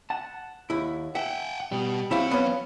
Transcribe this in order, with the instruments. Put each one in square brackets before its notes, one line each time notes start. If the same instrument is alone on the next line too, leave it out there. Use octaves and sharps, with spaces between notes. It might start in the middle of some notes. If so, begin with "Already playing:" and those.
[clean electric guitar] F#5 A5
[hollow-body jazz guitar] D#2 E4
[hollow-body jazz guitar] E5 [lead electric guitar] F#5 G5
[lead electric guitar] B2 [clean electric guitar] G3
[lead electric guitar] F#3 C#5 [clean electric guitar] C4 C5 F5 [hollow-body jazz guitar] E4 G4
[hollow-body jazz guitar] B3 C#4